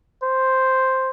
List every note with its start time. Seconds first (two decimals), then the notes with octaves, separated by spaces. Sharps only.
0.23 C5